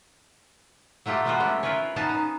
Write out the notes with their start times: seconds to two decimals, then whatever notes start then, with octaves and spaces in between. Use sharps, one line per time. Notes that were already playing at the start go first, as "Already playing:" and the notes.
1.06 F#3 A3 F4 G4 A4
1.25 F3 F#3 G#3 B3 F4 F#4
1.40 G3 A3 C4 C#4
1.63 E4 F4 A#4 B4 C#5
1.96 B3 C#4 D#4 F#4 F5 A5
2.09 D#4